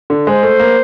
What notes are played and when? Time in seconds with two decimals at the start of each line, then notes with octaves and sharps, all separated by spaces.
0.10 D3
0.27 G#3 C5
0.43 A3
0.60 A#3